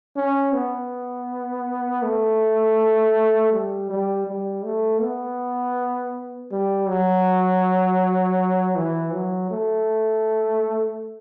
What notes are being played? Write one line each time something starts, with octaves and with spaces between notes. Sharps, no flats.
C#4
B3
A3
G3
G3
G3
A3
B3
G3
F#3
E3
F#3
A3